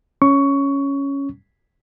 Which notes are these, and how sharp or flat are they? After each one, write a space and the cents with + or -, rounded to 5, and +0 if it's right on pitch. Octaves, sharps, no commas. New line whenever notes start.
C#4 +0 C#6 +15